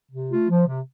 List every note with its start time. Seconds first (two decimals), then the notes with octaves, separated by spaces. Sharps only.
0.11 C3
0.30 A3 F4
0.48 F3
0.67 C3